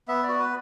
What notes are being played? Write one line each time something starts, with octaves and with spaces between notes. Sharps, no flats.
B3 E5
D5
F#4
B4